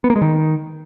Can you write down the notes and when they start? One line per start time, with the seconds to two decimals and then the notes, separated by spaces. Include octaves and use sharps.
0.04 B3
0.10 A#3
0.16 G#3
0.21 D#3